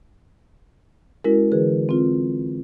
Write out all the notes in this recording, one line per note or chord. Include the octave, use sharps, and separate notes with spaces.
G#3 C#4 E4 F#4 A#4
D3 E3 G#4 B4
C4 F4